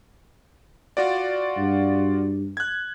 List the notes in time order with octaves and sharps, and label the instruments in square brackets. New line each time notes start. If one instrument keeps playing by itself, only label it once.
[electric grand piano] F4 F#4 D5
[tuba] G2
[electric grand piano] F#6 G#6